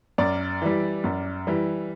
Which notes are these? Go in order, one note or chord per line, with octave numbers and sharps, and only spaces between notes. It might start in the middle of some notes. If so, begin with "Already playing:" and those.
F#2 D5
E3 G3
F#2
E3 G3